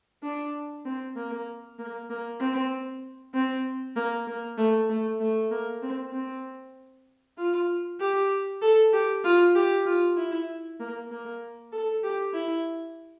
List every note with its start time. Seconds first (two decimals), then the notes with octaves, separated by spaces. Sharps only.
0.23 D4
0.85 C4
1.16 A#3
1.79 A#3
2.10 A#3
2.40 C4
3.34 C4
3.96 A#3
4.27 A#3
4.58 A3
4.89 A3
5.20 A3
5.51 A#3
5.83 C4
6.13 C4
7.38 F4
8.00 G4
8.62 A4
8.93 G4
9.24 F4
9.55 G4
9.86 F4
10.17 E4
10.80 A#3
11.11 A#3
11.72 A4
12.04 G4
12.34 E4